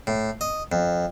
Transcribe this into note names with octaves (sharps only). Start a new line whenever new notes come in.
A2
D#5
F2